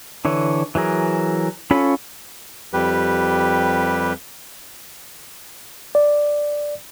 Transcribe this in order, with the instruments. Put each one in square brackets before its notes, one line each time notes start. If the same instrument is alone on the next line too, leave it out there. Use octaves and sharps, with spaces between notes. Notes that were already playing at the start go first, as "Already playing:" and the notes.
[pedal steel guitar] D3 E3 C#5
E3 F#3 G#4 A#4
C#4 F4 A4 C#5 B5
[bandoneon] F2 G3 G4 B4
[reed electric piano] D5